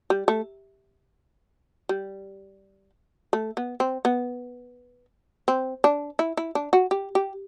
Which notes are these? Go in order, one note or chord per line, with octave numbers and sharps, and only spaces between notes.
G3
A3
G3
A3
B3
C4
B3
C4
D4
E4
E4
D4
F#4
G4
G4